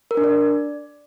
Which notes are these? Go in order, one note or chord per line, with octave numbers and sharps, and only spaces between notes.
A#4
D4
D5